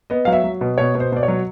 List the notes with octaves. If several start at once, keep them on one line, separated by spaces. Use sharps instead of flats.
B3 D#5
F#3 F5
E5
F#3
B2
B2 C#5
B2
C5
B2 D5
C#5
F#3